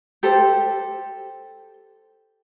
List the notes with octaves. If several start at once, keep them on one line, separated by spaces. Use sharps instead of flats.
G4 A4 C5